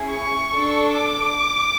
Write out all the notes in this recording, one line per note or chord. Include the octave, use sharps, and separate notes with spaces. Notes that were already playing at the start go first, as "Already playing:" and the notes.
Already playing: C#4 E4 G#4
C#6
D4 A4
D6